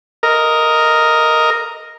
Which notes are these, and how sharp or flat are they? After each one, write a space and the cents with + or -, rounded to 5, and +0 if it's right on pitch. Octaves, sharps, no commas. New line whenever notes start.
A#4 +0 D#5 +5